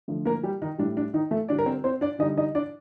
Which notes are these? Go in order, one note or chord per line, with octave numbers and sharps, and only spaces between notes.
D3 F3 A3
A#3 A#4
G3 G4
D#3 D#4
A2 G3 D4
D4
D#3 D#4
A3 A4
D3 G3 D4 D5
A#4
C4 C5
C4 C5
D4 D5
D3 G3 D#4 D#5
D#4 D#5
D4 D5